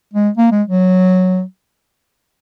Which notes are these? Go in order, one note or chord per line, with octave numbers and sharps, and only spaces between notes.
G#3
A#3
G#3
F#3